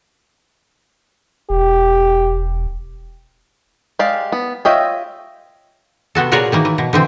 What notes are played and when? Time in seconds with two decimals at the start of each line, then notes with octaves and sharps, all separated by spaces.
1.50 E1 G4
3.99 G#3 G4 D5 F5
4.32 B3
4.65 F4 C#5 D#5 E5 G5
6.15 C3 B3 F#4 A4
6.32 A#2 F#4 G#4 A#4 C#5 D5
6.52 D#3 E3 A#3
6.65 E3
6.78 B2
6.93 D3 E3 C4